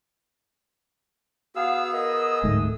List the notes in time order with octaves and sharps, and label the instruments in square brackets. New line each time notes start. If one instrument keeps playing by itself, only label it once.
[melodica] B3 G#4 E6 [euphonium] F#4 [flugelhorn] F5
[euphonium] A#4 [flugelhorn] D#5
[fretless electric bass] D1 G#2 A3